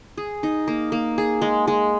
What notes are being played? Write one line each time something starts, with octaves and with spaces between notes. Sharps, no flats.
G#4
D#4
A#3
A#3
G#4
G#3
G#3